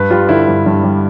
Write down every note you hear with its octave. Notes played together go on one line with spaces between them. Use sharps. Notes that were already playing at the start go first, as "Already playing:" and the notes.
Already playing: G2 B4
G3 F4
D3 E4
G2
G2
G3